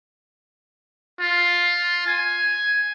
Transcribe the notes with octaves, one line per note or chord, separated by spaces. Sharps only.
F4
G#5